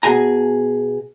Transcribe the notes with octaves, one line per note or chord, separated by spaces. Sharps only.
B2 G#4 G#5 A#5